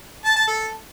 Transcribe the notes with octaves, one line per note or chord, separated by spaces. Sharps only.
A5
A5
A4